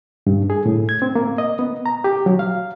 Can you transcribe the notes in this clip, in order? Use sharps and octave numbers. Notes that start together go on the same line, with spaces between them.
G2
G#4
A2
G#6
C4
A#3
D#5
B3
A#5
G4
F#3
F5